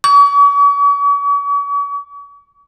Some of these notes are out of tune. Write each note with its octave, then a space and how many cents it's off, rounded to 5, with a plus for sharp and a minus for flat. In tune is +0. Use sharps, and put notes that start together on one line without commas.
C#6 +45